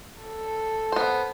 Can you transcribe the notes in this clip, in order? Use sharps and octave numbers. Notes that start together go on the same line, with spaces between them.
A4
B3 C5